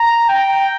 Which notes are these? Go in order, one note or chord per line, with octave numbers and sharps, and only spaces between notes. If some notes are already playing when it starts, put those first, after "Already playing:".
Already playing: A#5
G5